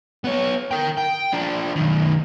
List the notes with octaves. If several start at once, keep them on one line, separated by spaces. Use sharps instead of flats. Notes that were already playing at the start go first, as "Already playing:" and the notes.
B3 C#5
A#4 G5
G5
F3 D4
B1 D#3